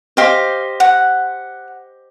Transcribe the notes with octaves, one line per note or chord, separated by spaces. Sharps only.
G4 C5 D#5 F5
F#5